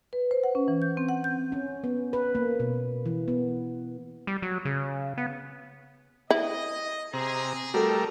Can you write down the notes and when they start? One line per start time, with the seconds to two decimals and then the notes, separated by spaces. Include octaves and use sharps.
0.13 B4
0.31 C5
0.44 F#5
0.55 C#4
0.68 E3
0.82 G6
0.97 C4
1.09 F#5
1.24 G6
1.52 C#4
1.84 B3
2.13 B4
2.35 A#3
2.60 B2
3.06 E3
3.28 B3
4.27 G3
4.42 F#3
4.65 C#3
5.18 B3
6.31 E4 D#5
7.13 C3 G#4 A#5
7.74 G3 A3 F#4 A4 A#4